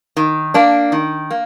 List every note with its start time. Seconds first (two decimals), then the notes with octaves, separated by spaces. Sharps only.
0.17 D#3
0.54 A#3 D4
0.92 D#3
1.30 A#3